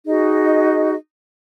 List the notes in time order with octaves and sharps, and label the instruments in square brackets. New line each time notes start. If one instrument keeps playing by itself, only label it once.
[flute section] D#4 F#4 G#4 D#5